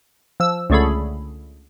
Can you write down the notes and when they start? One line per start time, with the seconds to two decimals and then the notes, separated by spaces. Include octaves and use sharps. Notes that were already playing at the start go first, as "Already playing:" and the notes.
0.40 F3 E6
0.70 C#2 D3 A3 G#4 A4 B5